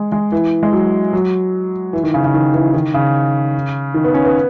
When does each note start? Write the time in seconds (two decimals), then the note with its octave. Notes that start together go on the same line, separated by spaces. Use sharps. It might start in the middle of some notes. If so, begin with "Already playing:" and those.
Already playing: G#3
0.12 G#3
0.32 E3
0.63 G#3
0.73 F#3
1.13 F#3
1.93 E3
2.04 D#3
2.14 C#3
2.24 C#3
2.34 D#3
2.54 E3
2.74 D#3
2.94 C#3
3.94 D#3
4.04 B3
4.14 C#4
4.25 B3